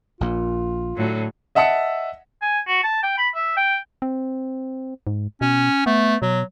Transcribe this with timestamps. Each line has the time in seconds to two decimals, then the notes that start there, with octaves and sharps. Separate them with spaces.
0.21 A#1 A#2 F4
0.95 A2 D3 F#3
1.55 D#5 E5 F#5 A5 E6 C#7
2.42 G#5
2.68 F#4
2.84 A5
3.03 G5
3.18 B5
3.35 E5
3.57 G5
4.02 C4
5.07 G#2
5.41 B2 C#4
5.86 A3 B3
6.22 B2 F#3